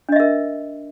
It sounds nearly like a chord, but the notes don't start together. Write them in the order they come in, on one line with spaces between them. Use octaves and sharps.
D4 D#5 E5 A#4